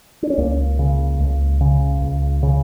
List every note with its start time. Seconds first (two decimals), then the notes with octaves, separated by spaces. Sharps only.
0.23 D4
0.30 C#4
0.38 C#2 A#3
0.79 C#3
1.20 C#2
1.61 C#3
2.01 C#2
2.43 C#3